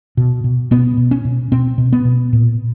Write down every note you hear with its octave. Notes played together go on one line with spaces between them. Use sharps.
B2
B2
B2 B3
B2
C#4
B2
B2 C4
B2
B3
B2
A#2